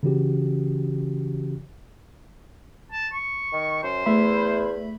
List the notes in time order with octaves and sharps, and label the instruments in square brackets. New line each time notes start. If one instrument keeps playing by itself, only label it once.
[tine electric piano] C#3 E3 C#4 F#4 G4
[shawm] A5
C#6
[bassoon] D#3
[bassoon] F#2 [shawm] C5
[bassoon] E2 [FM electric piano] A3 E5 B5